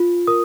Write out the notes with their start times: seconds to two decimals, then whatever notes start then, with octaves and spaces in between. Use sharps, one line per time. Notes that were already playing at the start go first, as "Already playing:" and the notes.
Already playing: F4
0.27 A#4 D#6